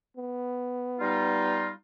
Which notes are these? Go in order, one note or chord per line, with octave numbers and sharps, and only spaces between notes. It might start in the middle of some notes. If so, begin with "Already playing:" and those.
B3
G3 D#4 F4